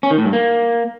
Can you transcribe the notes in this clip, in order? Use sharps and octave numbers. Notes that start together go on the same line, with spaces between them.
C#4
D#3
A2
G2
A#3